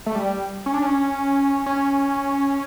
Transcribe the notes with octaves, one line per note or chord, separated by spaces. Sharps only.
A3
G3
C#4
D4
C#4
C#4